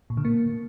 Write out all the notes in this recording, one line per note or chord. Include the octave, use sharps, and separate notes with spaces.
A#2
D3
A#3